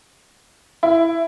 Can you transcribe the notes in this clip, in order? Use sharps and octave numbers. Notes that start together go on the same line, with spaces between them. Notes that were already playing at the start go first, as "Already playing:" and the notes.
E4